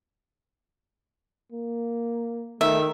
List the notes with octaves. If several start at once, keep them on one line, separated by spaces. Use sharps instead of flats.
A#3
D#3 A3 E5